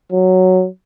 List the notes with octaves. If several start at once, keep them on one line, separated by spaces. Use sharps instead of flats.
F#3